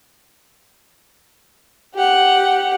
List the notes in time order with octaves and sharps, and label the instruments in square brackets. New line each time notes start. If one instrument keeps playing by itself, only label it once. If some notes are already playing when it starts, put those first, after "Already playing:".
[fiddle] G4 F#5